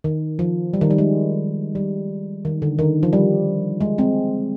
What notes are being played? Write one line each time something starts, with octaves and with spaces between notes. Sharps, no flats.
D#3
F3
G3
D#3
G3
G#3
G3
D#3
D3
D#3
F3
G3
G#3
G#3 C4